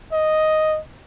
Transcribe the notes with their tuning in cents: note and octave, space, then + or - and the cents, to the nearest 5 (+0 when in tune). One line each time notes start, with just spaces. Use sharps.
D#5 +0